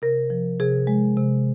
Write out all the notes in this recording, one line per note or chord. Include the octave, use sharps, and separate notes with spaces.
C3 A#4
F3
C3 G#4
G#3
C3